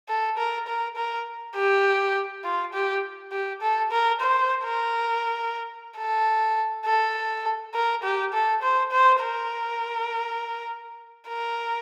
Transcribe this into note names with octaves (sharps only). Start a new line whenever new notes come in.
A4
A#4
A#4
A#4
G4
F4
G4
G4
A4
A#4
C5
A#4
A4
A4
A#4
G4
A4
C5
C5
A#4
A#4